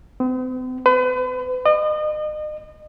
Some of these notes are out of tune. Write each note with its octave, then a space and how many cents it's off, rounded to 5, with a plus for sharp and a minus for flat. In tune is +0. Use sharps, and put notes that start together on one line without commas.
C4 -45
B4 +40
D#5 -35